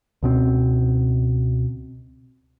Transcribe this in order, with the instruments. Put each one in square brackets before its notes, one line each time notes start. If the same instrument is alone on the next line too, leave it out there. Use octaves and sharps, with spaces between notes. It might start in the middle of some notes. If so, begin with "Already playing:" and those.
[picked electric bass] C#2 B2 C4